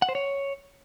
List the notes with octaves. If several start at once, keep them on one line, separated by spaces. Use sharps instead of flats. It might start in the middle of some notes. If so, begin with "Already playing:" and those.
F#5
C5
C#5